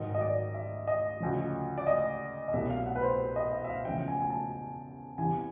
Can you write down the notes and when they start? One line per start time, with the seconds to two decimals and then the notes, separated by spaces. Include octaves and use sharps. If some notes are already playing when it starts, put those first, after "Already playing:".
Already playing: G#2 D#3 F#3 D#5
0.15 D#5
0.21 D5
0.54 E5
0.87 D#5
1.20 D2 C#3 F3
1.78 D5
1.87 D#5
2.48 D#5
2.53 C2 B2 F#3 E5
2.70 F5
2.86 F#5
2.96 B4
3.03 C5
3.36 D#5
3.52 E5
3.64 E5
3.69 F5
3.85 E2 C#3 F3 G5
4.08 G#5
4.20 G#5
4.30 A5
5.18 E2 C3 E3 G3 G#5